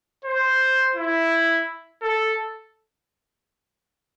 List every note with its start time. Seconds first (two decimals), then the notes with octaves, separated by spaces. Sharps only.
0.24 C5
0.95 E4
2.02 A4